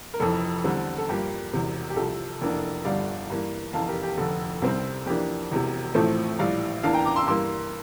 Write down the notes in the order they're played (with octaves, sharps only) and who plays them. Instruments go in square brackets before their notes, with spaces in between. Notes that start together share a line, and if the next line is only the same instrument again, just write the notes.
[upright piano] A#4
F1 F2 E3 A4
E2 D3 G3 C4
A4
G2 F3 A#3 G4
E1 E2 C3
G4
C2 C3 F3 A4
F1 E2 E3 A#3 D4
G1 G2 D3 G3 D5 F5
G2 E3 A#3
F1 E2 E3 F5 A5
G4 A#4
G4
F1 F2 D3 A4
C2 C3 G3 C4
F2 E3 A#3 D4 G4
E1 E2 C3
A1 A2 F3 A3 C4 A4
A#1 A2 E3 G3 D5 F5
E2 E3 A#3 D4 F5 A5
G5 A#5
A#5 D6
C6 E6
G2 E3 A#3 C6 E6